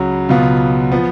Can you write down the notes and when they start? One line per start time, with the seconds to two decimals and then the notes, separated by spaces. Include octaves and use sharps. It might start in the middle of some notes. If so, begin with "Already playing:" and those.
Already playing: C#2 C#3 F#3
0.29 C#2 B2 F#3 B3 F4
0.92 F3 B3